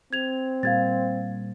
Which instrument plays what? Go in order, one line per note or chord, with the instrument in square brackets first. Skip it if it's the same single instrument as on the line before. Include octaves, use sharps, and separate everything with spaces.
[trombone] C4 [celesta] G#6 F7
[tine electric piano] A#2 G3 A#3 [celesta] F5 G#6 A6